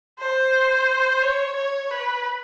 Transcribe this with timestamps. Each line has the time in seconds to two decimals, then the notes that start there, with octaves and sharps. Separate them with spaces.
0.19 C5
1.22 C#5
1.56 C#5
1.91 B4